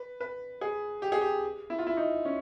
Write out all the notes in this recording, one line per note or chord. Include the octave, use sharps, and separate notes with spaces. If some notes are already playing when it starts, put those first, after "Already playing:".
Already playing: B4
B4
G#4
G4
G#4
G4
E4
F4
E4
D#4
C#4